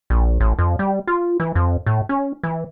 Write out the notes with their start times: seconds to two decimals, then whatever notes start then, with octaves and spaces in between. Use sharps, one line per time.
0.10 A#1
0.40 A1
0.59 F2
0.79 G3
1.07 F4
1.40 E3
1.55 F2
1.86 A2
2.09 C#4
2.43 E3